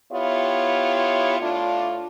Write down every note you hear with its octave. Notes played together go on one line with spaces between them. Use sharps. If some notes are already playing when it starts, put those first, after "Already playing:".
B3 E4 F4 G4 C#5
A2 D4 F4